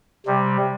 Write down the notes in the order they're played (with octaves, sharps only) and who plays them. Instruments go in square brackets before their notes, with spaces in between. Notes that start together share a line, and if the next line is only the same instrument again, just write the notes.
[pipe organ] C3 G3